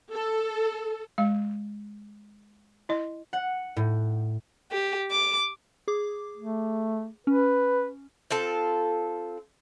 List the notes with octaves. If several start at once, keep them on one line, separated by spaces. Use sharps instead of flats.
A4
G#3 F5
E4 D#5
F#5
A2
G4
D6
G#4 D6
A3
C#4 B4
C4 F4 A4